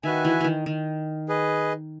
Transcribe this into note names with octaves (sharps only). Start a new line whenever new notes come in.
D#3 F#4 B4 E5 G#5
E3
D#3 E3
D#3
G#4 B4 D#5